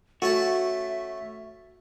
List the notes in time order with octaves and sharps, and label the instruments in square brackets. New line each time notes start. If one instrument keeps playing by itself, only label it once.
[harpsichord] A3 C#4 A5 [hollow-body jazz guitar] F#4 [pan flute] E5